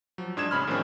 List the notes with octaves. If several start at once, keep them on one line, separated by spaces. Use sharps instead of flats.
F3 F#3
G#2 D4 D#6 G#6 E7
A1 C#3 C#4 B5 C6 F6
A2 D#3 F3 C4 D4 G#4